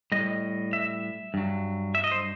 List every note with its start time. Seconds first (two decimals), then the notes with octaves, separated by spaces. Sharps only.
0.12 A2 G3 D#5
0.73 E5
1.34 G2 F#3
1.95 E5
2.04 D#5
2.12 C5